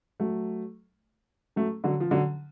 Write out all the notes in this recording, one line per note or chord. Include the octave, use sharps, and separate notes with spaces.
F#3 A3
F#3 A3
D3 F#3
F3
D3 F#3